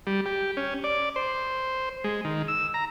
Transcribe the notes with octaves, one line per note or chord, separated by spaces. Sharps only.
G3
G4
C#4
D5
C5
G#3
D#3
E6
A#5